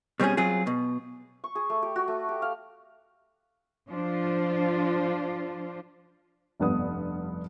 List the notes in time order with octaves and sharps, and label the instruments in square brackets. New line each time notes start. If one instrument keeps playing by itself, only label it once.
[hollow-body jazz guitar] B2 G3 C4 C#4 G#4
F#3 C4 F4 G#4
B2
[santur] C#6
G#4
A3
G4
F#4
A3
G4
F5
[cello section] F3 D4 F4 C5
[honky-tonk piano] F1 G2 B3 D#6